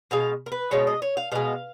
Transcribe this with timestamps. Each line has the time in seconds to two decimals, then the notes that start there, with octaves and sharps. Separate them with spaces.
0.11 B2 G#3 F5
0.46 A#4
0.52 B4
0.71 B2 G#3 C#5
0.87 D#5
1.02 C#5
1.17 F5
1.32 B2 G#3 F5